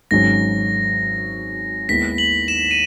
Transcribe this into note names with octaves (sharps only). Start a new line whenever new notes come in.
G#1 G#2 F#3 C#4 A#6
D#2 D#3 G#3 B3 E4 B6
F#7
E7
D#7